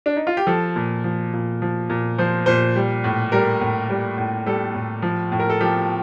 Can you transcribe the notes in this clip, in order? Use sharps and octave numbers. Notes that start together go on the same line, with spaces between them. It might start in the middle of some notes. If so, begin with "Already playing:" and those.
D4
D#4
F4
G4
F3 A4
A#2
F3
A#2
F3
A#2
F3 C5
A#2 C5
G3
A2
G3 A#4
A2
G3
A2
G3 A4
A2
F3
A2
A#4
A4
F3 G4